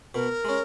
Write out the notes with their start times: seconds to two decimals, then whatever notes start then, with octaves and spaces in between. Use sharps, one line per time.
0.14 B2 A#4
0.45 G#3 C#4